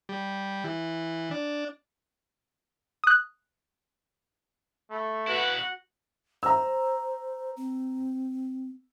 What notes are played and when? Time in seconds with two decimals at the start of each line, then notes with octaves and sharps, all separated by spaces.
0.09 G3
0.64 E3
1.31 D4
3.04 D#6 F#6
4.91 A3 B5
5.27 B2 E4 F#4 B4 F#5
6.43 C5 A#5 E6
7.57 C4